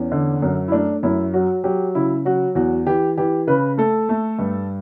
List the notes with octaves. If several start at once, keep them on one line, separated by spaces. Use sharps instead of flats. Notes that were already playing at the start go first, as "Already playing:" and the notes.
Already playing: E2 C#4
D3
F#2
E4
A3 D4
F#2 E4
F#3 F#4
F#3 G4
C#3 E4
F#3 F#4
E2 F#4
E3 G4
E3 G4
C#3 B4
A3 A4
A3
G2